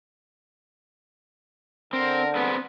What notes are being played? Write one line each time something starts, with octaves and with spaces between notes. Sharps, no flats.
D3 C4 A#4
B3 C4 G#4 B4